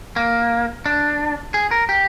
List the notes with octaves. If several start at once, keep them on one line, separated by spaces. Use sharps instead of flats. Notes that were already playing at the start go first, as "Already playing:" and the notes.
A#3
D4
G#4
A#4
G4